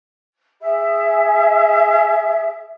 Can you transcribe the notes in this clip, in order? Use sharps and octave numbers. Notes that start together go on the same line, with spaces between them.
G#4 E5